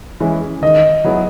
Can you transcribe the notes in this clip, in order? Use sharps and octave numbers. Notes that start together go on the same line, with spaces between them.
E3 G#3 C#4 E4
D#3 D#5
F#3 B3 E4 G#4